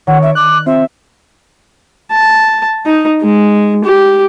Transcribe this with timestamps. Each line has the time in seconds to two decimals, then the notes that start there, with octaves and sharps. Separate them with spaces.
0.07 D#3 C#5 F#5
0.22 D5 E5
0.35 D6 F#6
0.66 C4 F4 E5
2.11 A5
2.86 D#4
3.21 G#3
3.85 G4